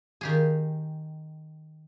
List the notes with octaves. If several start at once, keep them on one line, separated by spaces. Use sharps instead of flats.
D#3 G4 G#4